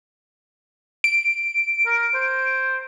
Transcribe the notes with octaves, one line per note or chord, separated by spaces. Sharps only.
D7
A#4
C5